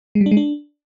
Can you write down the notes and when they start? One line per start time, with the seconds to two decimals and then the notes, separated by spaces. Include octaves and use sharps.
0.15 G#3
0.21 G3
0.26 D4
0.31 G#3
0.37 D4